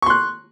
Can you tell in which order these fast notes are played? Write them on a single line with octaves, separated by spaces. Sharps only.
C#6 C6 F#6